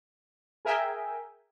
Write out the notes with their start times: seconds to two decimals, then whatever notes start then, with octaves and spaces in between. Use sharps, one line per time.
0.65 G#4 A#4 E5 G5 G#5